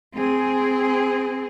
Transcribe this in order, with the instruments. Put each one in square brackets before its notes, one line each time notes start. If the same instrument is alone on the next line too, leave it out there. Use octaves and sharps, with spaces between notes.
[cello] C4 G#4